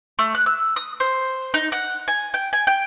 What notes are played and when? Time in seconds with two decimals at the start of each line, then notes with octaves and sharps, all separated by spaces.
0.19 A3
0.35 F#6
0.46 E6
0.76 D#6
1.00 C5
1.54 D#4
1.72 F#5
2.08 G#5
2.34 G5
2.53 G#5
2.67 G5